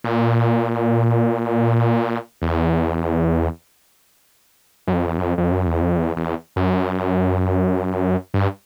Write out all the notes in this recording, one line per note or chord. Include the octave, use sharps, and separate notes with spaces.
A#2
E2
F#2
F2
E2
F#2
F2
F2
F#2
E2
F2
E2
E2
F#2
G2